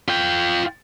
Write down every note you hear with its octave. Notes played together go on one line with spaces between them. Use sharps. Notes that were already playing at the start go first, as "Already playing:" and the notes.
F4 G5